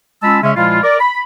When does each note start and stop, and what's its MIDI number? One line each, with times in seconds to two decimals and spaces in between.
0.23 0.41 56
0.23 0.41 61
0.23 0.41 65
0.23 0.41 81
0.23 0.41 83
0.23 0.41 88
0.43 0.52 49
0.43 0.52 56
0.43 0.52 61
0.43 0.52 76
0.57 0.80 46
0.57 0.80 53
0.57 0.80 56
0.57 0.80 64
0.57 0.80 65
0.84 0.99 70
0.84 0.99 74
1.00 1.22 83